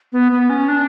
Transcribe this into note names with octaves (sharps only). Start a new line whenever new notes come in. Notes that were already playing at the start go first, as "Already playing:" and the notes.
B3
B3
C#4
D4